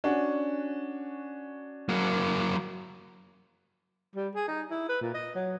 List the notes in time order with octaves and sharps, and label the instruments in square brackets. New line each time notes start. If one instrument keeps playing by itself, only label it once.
[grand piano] C#4 D4 F#4
[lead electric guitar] F#3 A#3
[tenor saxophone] G3
G#4
D#4
E4
B4
A#2
D#5
F#3